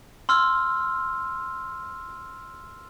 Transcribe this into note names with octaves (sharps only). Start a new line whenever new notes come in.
C6 E6 F6